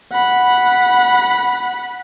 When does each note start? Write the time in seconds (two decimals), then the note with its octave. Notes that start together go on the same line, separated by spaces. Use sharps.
0.12 F#5 B5